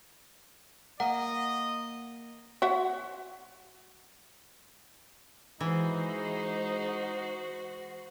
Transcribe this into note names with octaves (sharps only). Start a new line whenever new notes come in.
A#3 D#5 F#5
F#4 E5 F#5
E3 G#3 D#4 F#4 C5